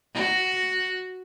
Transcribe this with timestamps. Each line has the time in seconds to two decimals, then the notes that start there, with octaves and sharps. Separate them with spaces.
0.14 F#4